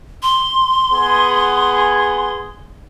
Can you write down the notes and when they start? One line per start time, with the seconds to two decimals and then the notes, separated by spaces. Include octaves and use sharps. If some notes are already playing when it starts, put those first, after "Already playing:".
0.23 C6
0.93 B3 G#4